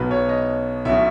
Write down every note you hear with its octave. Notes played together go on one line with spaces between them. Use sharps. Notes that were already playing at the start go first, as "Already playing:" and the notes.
Already playing: B1 B2 B4
C#5
D#5
B1 B2 E5